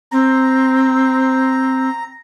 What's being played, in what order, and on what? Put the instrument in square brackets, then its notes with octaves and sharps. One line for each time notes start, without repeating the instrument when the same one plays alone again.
[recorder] C4 [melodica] A#5